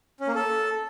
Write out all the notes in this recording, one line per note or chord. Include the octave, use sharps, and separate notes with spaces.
C#4
A#3
A4